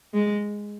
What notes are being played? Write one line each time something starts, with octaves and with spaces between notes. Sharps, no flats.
G#3